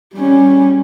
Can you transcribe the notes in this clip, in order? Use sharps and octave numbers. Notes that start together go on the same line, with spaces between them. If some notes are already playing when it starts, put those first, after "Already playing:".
G3 C#4